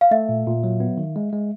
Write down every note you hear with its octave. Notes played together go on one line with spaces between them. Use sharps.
F5
A3 E5
A#2
A#2
F#3
B3
D#3
G#3
G#3